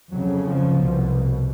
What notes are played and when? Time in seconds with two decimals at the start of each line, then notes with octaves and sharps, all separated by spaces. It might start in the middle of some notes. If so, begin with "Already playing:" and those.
0.12 F2 C#3 F#3
0.43 F3
0.76 C2 B2